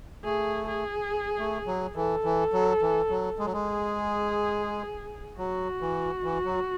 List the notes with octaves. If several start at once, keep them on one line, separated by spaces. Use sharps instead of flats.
A3 G#4
G#4
A3
F#3
E3 A4
E3
F#3
E3
F#3
G#3
F#3
G#3
G#4
F#3 F#4
E3
E3
F#3